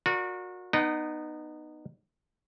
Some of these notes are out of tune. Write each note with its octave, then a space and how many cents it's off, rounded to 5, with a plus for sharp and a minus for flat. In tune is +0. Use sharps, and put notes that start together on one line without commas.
F#4 -30 A#4 +0 D5 +0
B3 +0 D#4 -25 F#5 +45